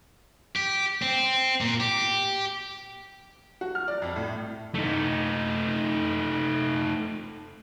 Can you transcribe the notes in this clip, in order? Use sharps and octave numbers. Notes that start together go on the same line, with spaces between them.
G4
C4
A#2
G4
F#4
F6
D5
F2
A2
A3 D#4